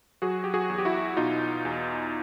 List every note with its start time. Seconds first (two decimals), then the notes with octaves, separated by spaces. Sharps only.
0.22 F#3 F#4 G#4
0.44 G4
0.54 F#4 G#4
0.70 E2
0.78 G4
0.85 E4 F#4
1.17 B2 D#4 F4
1.65 E2